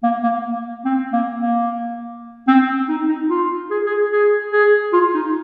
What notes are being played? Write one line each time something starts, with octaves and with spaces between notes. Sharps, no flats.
A#3
A#3
C4
A#3
A#3
C4
D#4
D#4
F4
G#4
G#4
G#4
G#4
F4
D#4